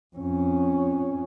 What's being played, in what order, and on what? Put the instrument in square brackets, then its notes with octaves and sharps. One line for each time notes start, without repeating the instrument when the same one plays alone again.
[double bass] F2 C#4